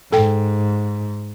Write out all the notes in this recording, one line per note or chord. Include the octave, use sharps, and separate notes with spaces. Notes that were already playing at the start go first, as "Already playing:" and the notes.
G#2 A4 G5